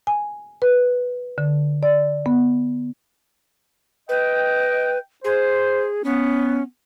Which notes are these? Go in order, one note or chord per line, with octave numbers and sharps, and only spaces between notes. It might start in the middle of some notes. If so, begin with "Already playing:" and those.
G#5
B4
D3
D5
B3
B4 D#5 G5
G#4 C5
B3 C#4